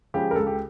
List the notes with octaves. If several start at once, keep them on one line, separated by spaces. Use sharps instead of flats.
C#3 F3 G#3 C#4 G4
A#4
C#2 A4
G4